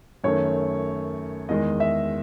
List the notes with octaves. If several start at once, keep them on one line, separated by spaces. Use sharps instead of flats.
F#2 D#3 A3 C#5
E2 D#3 G#3 D#5
E5